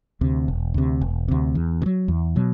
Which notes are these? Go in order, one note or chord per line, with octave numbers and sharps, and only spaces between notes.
D2 C3
E1
D2 C3
E1
D2 C3
E2
B2
F#3
E2
B2 F#3